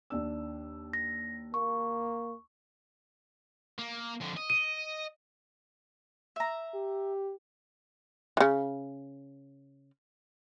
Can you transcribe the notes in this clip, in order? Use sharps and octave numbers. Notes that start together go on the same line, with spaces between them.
D#2 D4 E6
A#6
A#3 C#6
A#3
F2 D3
D#5
D#7
E5 A#5
G4
C#3 E3